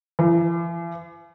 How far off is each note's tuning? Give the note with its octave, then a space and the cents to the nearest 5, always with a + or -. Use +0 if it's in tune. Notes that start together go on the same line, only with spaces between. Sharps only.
E3 +45